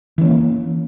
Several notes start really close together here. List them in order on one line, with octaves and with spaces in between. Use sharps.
E3 C#4 A#3